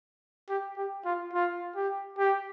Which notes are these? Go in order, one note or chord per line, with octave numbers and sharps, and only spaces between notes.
G4
G4
F4
F4
G4
G4